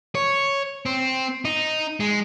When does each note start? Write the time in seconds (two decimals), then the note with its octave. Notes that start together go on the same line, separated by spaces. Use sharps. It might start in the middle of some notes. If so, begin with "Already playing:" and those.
0.15 C#5
0.86 C4
1.45 D#4
2.00 G#3